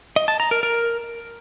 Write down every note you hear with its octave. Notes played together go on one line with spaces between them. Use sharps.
D#5
A5
A#5
A#4
A#4